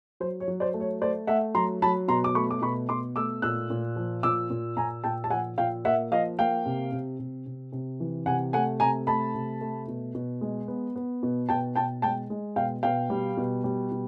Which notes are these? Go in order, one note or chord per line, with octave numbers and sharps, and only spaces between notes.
F#3 C5
C#5
F#3
C5 D5
A3
C#5
A3 C5 D5
A3 E5 F#5
F#3 A#5 C6
F#3 A5 B5
B2 A#5 C6
D6
A3 B5 C#6
D6
B2 B5 C#6
B2 C6 D6
A3 D6 E6
A#2 E6 F#6
A#2
F3
A#2 D6 E6
A#2
A#2 G#5 A#5
A#2 G5 A5
A5
F3 F#5 G#5
A#2 F5 G5
A#3 E5 F#5
F3 D#5 F5
A#3 F5 G5
C3
C3
C3
C3
C3
E3
C3 F#5 G#5
A3 F#5 G#5
C3 G#5 A#5
A3 A5 B5
C3
A3
B2
B2
G#3
B3
B3
B2
B2 G5 A5
B2 G5 A5
G#3 G5 A5
G#3
B2 F5 G5
B2 F5 G5
G3
B2
G3
B2